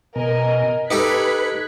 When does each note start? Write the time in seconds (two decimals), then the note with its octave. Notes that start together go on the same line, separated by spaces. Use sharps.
0.16 B2 A#4 D#5 G#5
0.91 D#4 G4 A4 B4 F#6 G#6 B6